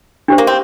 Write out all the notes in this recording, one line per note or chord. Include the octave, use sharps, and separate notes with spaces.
D4 G4 C5
A#3
C4